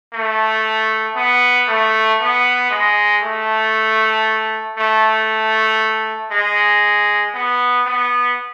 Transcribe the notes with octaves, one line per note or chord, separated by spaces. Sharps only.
A3
B3
A3
B3
G#3
A3
A3
G#3
B3
B3